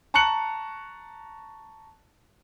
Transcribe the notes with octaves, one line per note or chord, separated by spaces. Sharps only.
A5 A#5 C#6 F#6 C#7 F#7